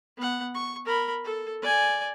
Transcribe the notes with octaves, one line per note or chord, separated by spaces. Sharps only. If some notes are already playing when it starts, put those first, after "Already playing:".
B3 F#5
C#6
A#4 B5
A4
D5 G#5